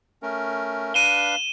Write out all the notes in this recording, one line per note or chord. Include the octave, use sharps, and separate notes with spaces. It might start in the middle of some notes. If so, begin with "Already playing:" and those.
A3 C#4 A#4
D4 B4 F5 D#7 E7 G7